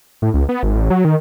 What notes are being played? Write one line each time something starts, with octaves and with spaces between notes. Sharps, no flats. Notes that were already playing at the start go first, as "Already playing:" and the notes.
A2
C#2
B3
G#1
A1
F#3
D#3